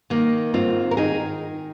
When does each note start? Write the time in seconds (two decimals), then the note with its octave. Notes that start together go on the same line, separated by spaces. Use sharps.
0.10 D#3 A#3
0.54 G#2 C4 F4
0.91 A#4
0.97 D#3 D#4 G#4